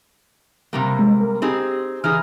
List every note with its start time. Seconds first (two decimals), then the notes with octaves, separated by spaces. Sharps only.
0.73 C3 G3 A#3
0.99 G#3
1.20 A#4
1.42 C4 D#4 G4 G#4
2.04 E3 D#4 G#4 F6